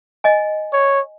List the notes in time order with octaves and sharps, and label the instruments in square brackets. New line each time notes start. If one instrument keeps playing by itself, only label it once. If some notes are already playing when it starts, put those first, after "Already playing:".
[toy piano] D#5 G#5
[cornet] C#5